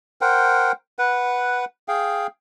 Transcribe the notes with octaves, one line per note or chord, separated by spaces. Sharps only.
A#4 C5 F#5 G5
B4 F#5
G#4 F5 G5